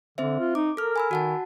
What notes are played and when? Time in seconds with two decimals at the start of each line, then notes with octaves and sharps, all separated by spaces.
0.18 D3 C4 C5 E5
0.39 F4
0.55 D#4 D6
0.77 A4 A#4 F6
0.96 G#5 B5 E6
1.11 D#3 F#4 F#5 A5